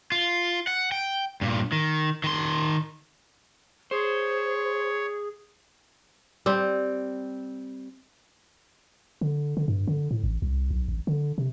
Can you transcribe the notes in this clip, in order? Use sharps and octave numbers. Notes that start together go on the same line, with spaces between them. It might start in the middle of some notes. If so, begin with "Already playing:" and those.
F4
F#5
G5
G2 A#2
D#3
D#3 C6
G#4 C5 C#5
G3 C4
D3
D3
G2
D3
A2
A1
C2
B1
A1
D3
C3